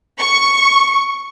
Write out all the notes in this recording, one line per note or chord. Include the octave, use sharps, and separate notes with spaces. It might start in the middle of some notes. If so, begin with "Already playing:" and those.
C#6